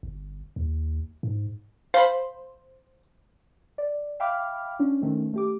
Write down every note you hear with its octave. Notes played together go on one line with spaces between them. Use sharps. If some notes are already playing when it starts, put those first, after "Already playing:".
G1
D#2
G#2
C5 F5 B5
D5
E5 F5 G5 B5 D6 F6
C#4 D4
D#3 A3 C4 C#4
A3 G4 D6